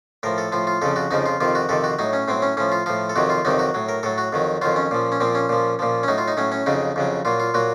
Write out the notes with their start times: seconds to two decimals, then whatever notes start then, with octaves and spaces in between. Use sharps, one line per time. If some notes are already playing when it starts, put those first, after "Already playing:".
0.23 A2 F3 A#4
0.38 A4
0.52 A2 F3 F4
0.67 F4
0.82 F2 C#3 F3 A4
0.96 F#4
1.11 F2 C#3 F3 D#4
1.26 F4
1.40 F2 C3 D#3 F4
1.55 F#4
1.69 F2 C3 D#3 A4
1.84 F#4
1.99 A2 F#3 D#4
2.13 C#4
2.28 A2 F#3 C4
2.42 C#4
2.57 A2 F3 C#4
2.72 F4
2.86 A2 F3 F4
3.09 A4
3.16 F2 C3 D#3 F#3 F#4
3.30 F4
3.45 F2 C3 D#3 F#3 D#4
3.59 F#4
3.74 A2 F#3
3.89 A#4
4.03 A2 F#3 A4
4.18 F#4
4.33 F2 D#3 F#3
4.62 F2 D#3 F#3 F4
4.76 C#4
4.91 A#2 F3
5.12 C#4
5.20 A#2 F3 C4
5.35 C#4
5.49 A#2 F3
5.79 A#2 F3
6.03 C#4
6.08 A2 F#3 D#4
6.18 F4
6.28 D#4
6.37 A2 F#3 C#4
6.52 C#4
6.66 F2 C#3 F#3 D#4
6.96 F2 C#3 F#3
7.25 A#2 F#3 F4
7.40 F4
7.54 A#2 F#3 F#4